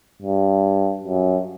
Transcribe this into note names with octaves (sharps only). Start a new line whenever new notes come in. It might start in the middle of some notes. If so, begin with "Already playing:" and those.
G2
F#2